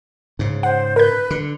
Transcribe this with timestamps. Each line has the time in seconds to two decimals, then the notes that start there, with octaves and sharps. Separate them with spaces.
0.39 G#2 C#3
0.63 C5 F#5
0.96 A#4 B4 G6
1.31 D3 C#7